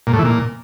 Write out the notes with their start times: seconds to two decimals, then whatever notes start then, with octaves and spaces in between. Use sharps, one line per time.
0.07 A#2
0.13 A2
0.19 E3
0.25 A#2